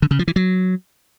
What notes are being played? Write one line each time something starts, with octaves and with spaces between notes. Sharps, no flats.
D3
C#3
F3
E3
F#3